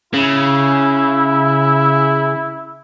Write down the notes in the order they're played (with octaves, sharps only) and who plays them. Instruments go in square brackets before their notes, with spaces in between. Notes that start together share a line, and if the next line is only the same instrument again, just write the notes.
[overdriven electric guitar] C#3 [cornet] E4